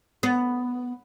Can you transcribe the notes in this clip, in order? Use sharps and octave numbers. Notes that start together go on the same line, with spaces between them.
B3